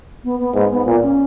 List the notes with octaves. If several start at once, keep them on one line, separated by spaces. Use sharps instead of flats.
B3
B3
G#2 B3
B3
A#2 A#3
C#4